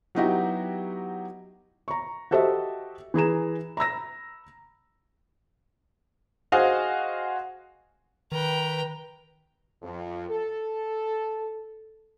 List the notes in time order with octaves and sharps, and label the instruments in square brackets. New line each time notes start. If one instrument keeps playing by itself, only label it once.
[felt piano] F#3 B3 D#4 E4 F#4 G4
A#5 C#6
F#4 G4 A4 C5 D#5 E5
E3 G#4 A#5 E7
A#5 B5 E6 A#6
F#4 G#4 C5 D#5 F5 G#5
[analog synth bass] D#3 [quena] B4 [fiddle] G5 A#5
[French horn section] F2
A4